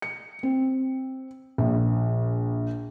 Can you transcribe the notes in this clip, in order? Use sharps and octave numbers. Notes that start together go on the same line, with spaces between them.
C#7
C4
A#1